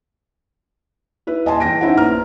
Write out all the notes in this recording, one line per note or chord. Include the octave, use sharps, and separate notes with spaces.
E4 B4 E5
D#1 D#5 G#5 A5 C6
E2 G5 A#6 D7
C#4 D#4 E4 C5 F#5
A#1 B3 A#5 F6